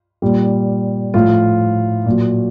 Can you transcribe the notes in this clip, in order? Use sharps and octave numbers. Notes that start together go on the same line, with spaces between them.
A#2 G3
A2 F3 F4
A#2 F#3